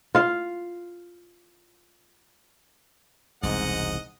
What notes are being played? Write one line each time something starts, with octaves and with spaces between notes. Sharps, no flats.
F4 F5
E1 C2 G#2 D#5 F#5